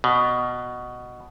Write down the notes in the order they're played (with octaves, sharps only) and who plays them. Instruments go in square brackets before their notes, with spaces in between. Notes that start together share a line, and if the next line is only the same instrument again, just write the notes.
[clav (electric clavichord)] B2